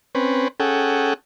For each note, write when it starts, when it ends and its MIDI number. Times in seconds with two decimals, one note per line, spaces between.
0.15 0.48 60
0.15 0.48 61
0.15 0.48 71
0.60 1.14 61
0.60 1.14 68
0.60 1.14 69
0.60 1.14 78
0.60 1.14 79